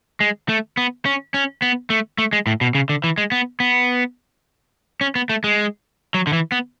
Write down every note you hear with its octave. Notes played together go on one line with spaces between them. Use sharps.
G#3
A3
B3
C#4
C#4
B3
A3
A3
G#3
A2
B2
C#3
D3
E3
G#3
B3
B3
C#4
B3
A3
G#3
F#3
D3
E3
B3